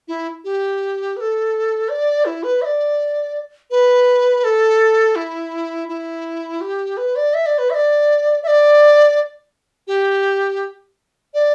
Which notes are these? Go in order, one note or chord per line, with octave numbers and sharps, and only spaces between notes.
E4
G4
B4
A4
D5
E4
B4
E5
D5
B4
A4
E4
E4
G4
B4
D5
E5
D5
B4
E5
D5
E5
D5
G4
D5